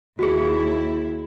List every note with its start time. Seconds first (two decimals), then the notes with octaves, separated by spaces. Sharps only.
0.19 D#2 E4 F#4 G#4